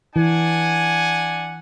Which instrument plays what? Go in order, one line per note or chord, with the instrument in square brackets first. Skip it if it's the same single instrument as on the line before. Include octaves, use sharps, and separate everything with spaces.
[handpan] E3 [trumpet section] D4 F#5 G#5